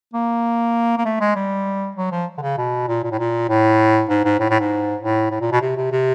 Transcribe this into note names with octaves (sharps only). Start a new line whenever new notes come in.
A#3
A#3
A3
G#3
G3
F#3
F3
D3
C#3
B2
A#2
A#2
A2
A#2
A2
G#2
G#2
A2
A2
G#2
A2
A2
A#2
B2
C3
C3
C3